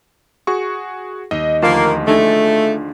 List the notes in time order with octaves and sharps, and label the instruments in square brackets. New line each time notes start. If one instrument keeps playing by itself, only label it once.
[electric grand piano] F#4 G#4 C#6
[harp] D#2 [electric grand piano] D#5
[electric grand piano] D2 F3 F4 [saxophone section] A#3 [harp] A5
[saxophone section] A3 [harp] D4 D#4 G#4